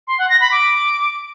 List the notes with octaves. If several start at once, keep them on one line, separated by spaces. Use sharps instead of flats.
C6
F#5
A#6
B5
D6